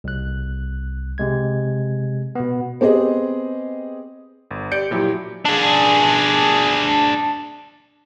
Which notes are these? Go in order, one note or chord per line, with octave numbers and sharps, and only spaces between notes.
C2 F#6
C3 G#3 G#6
B2 B3
B3 C4 G4 G#4 D#5
G1
G4 D5 G6 C#7 D7
A#2 F3 F#3 E4 G4
D4 G#4